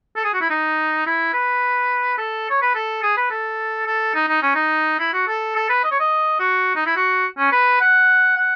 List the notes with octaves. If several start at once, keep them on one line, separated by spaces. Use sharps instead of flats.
A4
G#4
F#4
E4
D#4
E4
B4
A4
C#5
B4
A4
G#4
B4
A4
A4
D#4
D#4
C#4
D#4
E4
F#4
A4
A4
B4
D#5
C#5
D#5
F#4
D#4
E4
F#4
C#4
B4
F#5
F#5